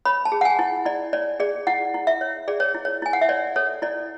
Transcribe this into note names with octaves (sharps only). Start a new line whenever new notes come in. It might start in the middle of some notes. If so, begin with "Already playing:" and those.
C#5 B5
A5
G#4
F#5
G#5
E4
E4 D5
C#5 D5
G#4 D5
E4 F#5
E4
E5
C#5
G#4 D5
C#5
E4
C#5
E4 G#5
F#5
E5
C#5 D5
A4 C#5
E4 D5